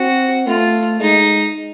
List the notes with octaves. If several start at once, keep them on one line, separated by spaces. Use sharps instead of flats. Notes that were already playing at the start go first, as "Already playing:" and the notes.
Already playing: C4 F#4
A3 F4
G#3 D#4